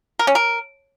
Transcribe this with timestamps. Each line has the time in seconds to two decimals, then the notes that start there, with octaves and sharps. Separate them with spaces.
0.19 A#4
0.27 C#4
0.35 A#4